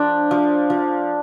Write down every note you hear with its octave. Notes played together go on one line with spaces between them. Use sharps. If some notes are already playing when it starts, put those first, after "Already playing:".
Already playing: F3 D4
F3
F3